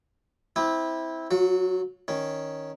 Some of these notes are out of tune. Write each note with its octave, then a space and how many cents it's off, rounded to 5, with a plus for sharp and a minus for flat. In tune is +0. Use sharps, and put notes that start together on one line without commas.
C4 +0 E4 -15 D6 +45
F#3 +0 F#4 -45
D#3 +0 C#4 +0